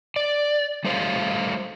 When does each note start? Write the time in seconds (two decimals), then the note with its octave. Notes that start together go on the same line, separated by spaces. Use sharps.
0.16 D5
0.84 G3 A3 C5 C#5 F5